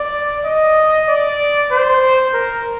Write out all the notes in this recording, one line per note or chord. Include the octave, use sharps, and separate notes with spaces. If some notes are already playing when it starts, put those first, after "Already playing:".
Already playing: D5
D#5
D5
C5
A#4